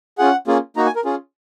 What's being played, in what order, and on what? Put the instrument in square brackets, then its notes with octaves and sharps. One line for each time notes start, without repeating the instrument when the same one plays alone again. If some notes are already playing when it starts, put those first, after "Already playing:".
[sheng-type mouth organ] C#4 F4 G#4 F#5
A#3 C#4 F4 G#4
A#3 D#4 F#4 A#5
G#5
A#4
C#4 F4 G#4